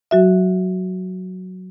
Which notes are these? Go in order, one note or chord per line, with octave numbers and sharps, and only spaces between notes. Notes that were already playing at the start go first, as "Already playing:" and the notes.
F#3 F#4 E5